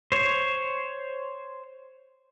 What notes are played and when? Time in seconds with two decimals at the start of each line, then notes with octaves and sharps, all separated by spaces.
0.12 C5 C#5